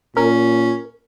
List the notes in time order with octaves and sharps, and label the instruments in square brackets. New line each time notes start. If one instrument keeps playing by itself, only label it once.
[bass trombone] A#2 [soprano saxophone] C#4 [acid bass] A#4